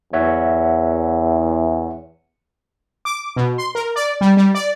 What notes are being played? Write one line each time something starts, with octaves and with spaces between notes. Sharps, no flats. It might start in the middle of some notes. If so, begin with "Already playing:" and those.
E2 C#5 E5 F#5
D6
B2
C6
A#4
D5
G3
G3
D5